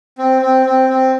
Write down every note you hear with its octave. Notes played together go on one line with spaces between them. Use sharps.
C4
C4
C4
C4